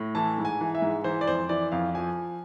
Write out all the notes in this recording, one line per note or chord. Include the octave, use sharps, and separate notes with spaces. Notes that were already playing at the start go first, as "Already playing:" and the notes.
Already playing: A2
E3 A5
G#2
G#5
E3
E5
G#2
E3 C5
D5
F2 C5
E3 D5
F2 F5
F3 G#5